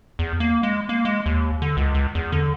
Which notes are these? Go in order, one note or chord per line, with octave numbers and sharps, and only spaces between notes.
E2
A#3
G#3
A#3
G#3
D#2
D3
C#2
C#2
E2
D3